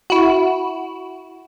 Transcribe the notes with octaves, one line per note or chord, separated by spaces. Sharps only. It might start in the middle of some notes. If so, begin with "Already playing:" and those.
E4 F#4